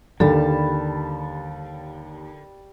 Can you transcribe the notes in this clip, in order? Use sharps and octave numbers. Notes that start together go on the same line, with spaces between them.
D#2 D3 G3 A4 A5